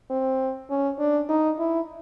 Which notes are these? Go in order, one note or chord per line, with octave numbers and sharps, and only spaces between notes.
C4
C#4
D4
D#4
E4